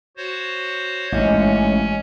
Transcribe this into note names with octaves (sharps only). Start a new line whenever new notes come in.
F#4 C5 C#5
A1 G#2 G#3 C#4 C#5 D#5